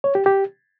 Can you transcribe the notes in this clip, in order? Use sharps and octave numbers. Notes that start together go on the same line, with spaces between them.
C#5
G4
G4